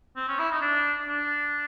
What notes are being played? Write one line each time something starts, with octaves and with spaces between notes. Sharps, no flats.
C4
C#4
E4
D#4
D4
D4